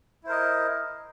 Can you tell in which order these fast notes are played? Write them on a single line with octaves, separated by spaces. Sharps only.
E4 C5 A#4 D#5